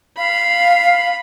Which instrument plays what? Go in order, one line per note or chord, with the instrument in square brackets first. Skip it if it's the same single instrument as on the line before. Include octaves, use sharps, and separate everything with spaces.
[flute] F5 [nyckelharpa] B5